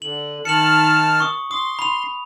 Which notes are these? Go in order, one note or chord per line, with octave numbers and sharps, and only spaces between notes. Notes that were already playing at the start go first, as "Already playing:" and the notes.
D3 F#7
D#3 A5 F6 C#7 F#7
C#6 D#6
C6 D#6
B5 F7